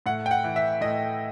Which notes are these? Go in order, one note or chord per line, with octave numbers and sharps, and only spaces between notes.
A2 F#5
G5
F#5
E3
E5
A2 D#5